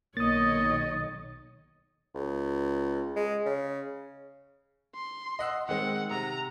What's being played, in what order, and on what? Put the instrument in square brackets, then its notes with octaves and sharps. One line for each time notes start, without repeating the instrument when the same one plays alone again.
[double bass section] B1 D#3 [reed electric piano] A#3 [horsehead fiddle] C#5 D#5 [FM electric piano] D#6 A6
[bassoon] C#2
G#3
C#3
[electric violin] C6
[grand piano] D#5 F#5 E6
[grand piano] D#3 G#3 C4 [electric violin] F#5
[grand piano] C3 [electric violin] A#5